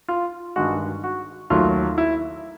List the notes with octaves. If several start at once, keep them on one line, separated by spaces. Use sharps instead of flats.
F4
G2 D#3 G#3 F#4
F#4
D#2 D#3 F#3 A3 F4
E4